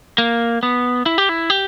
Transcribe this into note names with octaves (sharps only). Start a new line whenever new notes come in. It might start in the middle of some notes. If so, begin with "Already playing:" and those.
A#3
B3
E4
G4
E4
G4